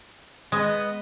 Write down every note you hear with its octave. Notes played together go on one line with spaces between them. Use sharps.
G#3 B3 B4 D#5